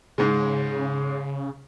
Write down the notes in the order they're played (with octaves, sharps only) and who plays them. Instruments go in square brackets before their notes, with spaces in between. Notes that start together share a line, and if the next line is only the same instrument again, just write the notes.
[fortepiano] G#2 G#3 [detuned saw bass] C#3